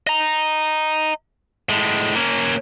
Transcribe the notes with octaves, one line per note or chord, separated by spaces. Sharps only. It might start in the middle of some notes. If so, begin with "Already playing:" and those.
D#5 A#5
A2 G#3
A#3 C#4